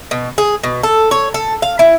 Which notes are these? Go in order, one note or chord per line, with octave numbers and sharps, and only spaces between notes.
B2
G#4
B2
A4
C#5
A4
F5
E4